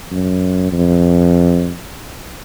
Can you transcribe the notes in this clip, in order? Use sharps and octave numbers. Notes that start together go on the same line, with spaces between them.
F#2
F2